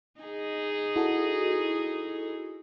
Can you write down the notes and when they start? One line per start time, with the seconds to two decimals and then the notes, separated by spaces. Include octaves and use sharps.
0.20 D#4 G#4
0.96 E4 F#4 A4